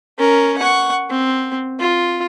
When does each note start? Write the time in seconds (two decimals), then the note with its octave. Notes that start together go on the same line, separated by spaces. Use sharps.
0.19 C#4 A#4
0.58 F#5 C#6
1.10 C4
1.79 F4